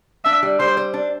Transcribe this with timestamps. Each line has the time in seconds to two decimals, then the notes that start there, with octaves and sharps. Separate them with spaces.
0.25 D4 E5
0.43 G3
0.59 G3 C5
0.77 C5
0.94 D4